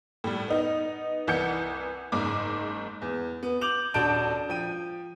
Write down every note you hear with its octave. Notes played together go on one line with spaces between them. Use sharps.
A2 G3
B3 D#4
C2 E3 F#5 G6 C#7
F#1 G#2 D6
E2
B3
D6 G6 F7 F#7
D#1 D4 F#4 A5 G6 D7
F3 G5 D#7